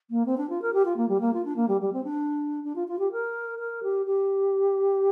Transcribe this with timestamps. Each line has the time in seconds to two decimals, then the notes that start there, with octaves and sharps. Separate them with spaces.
0.10 A#3
0.26 C4
0.37 D4
0.49 F4
0.61 A#4
0.73 G4
0.85 F4
0.96 A#3
1.08 G3
1.20 A#3
1.33 F4
1.45 D4
1.56 A#3
1.68 G3
1.81 G3
1.93 C4
2.04 D4
2.64 D4
2.75 F4
2.87 F4
2.99 G4
3.11 A#4
3.58 A#4
3.83 G4
4.06 G4